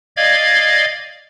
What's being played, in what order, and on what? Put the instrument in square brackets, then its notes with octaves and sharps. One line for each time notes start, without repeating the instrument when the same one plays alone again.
[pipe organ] D5 D#5 F5 G#6